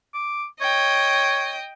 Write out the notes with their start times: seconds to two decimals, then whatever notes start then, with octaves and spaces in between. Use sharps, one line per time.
0.14 D6
0.61 C#5 D#5 G5